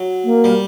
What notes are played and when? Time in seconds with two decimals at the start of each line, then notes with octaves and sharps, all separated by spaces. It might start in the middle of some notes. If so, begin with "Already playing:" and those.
Already playing: F#3
0.24 A#3
0.44 G3